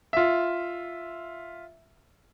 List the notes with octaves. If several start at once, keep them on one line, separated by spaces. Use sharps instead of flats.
F4 E5